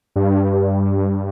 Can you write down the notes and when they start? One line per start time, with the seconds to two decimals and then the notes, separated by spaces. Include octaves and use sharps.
0.16 G2